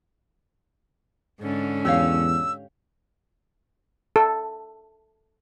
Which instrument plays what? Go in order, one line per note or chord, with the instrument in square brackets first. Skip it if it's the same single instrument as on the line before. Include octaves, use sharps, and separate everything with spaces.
[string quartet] G#2 D3 C#4
[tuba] E2 [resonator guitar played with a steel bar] G4 C#5 F5 [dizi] E6
[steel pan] A4